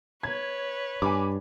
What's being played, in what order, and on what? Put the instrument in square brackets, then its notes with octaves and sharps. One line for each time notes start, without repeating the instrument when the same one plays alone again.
[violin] B4 C#5 [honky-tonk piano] G#6
[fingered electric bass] G2 [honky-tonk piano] G#5 B5 D6